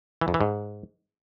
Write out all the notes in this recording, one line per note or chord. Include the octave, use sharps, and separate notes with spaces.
E3
F2
E3
G#2